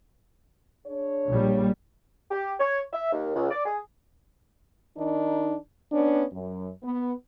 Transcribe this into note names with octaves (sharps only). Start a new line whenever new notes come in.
D4 G#4 C#5
A#1 G3
G4
C#5
E5
D#2
C#2
D5
G#4
D#3 D4 D#4
B3 C#4 D4
F#2
B3